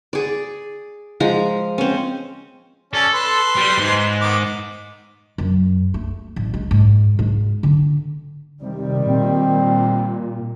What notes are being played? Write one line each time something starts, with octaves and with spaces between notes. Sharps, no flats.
G#4 D5
F3 G#3 A#5
C4 C#4
C#4 A4 D5
B4 C6
G3 G4
G#2
D#3 B3 D6
F#2
A3
A1
G#3
G#2
G#2
D3
C3 D#3 G3
A#2 C4